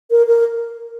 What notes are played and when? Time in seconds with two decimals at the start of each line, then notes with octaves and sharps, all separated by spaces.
0.11 A#4
0.27 A#4